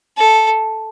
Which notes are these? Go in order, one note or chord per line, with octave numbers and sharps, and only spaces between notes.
A4